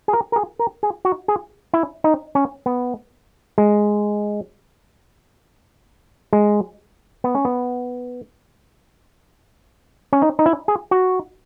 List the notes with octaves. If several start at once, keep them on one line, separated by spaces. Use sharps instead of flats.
G#4
A#4
A#4
G#4
A#4
G#4
F#4
G#4
E4
D#4
C#4
B3
G#3
G#3
B3
C#4
B3
C#4
D#4
D#4
E4
G#4
F#4